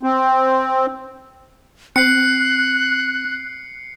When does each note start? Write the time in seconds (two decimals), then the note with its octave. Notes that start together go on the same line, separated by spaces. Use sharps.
0.03 C4
1.96 C4 F#6 C7 C#7